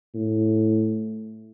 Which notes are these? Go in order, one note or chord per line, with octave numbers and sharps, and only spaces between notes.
A2